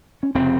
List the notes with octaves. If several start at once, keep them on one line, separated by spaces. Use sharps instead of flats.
C#4
F1 C#3 C4